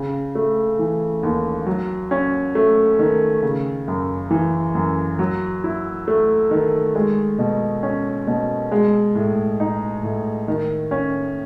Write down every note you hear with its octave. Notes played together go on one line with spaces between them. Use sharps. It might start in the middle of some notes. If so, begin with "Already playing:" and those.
Already playing: C#3
A3
E3
D#2
F#3
C#4
A3
D#3
C#3
F#2
E3
F#2
F#3
E4
A3
D#3
G#3
B2
C#4
B2
G#3
A2
D#4
A2
D#3
C#4